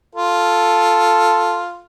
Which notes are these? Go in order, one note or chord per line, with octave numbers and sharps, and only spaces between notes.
F4 A4